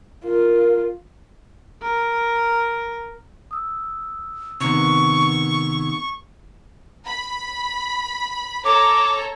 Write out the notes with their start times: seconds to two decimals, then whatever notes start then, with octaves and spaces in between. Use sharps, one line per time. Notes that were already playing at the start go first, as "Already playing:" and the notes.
0.24 F4 A#4
1.82 A#4
3.51 D#6 E6
4.61 C3 D#3 B3 C#6
7.07 B5
8.64 A4 C#5 A#5 D6